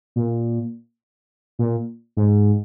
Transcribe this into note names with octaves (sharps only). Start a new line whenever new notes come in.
A#2
A#2
G#2